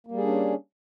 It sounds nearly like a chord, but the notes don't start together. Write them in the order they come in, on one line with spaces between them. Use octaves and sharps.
A#3 G3 G#4 D4 C#4